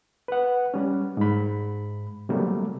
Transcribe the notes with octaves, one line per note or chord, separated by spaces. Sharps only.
B4 F#5
G3 C#4
G#2 B5
C3 F#3 G3 A3 A#3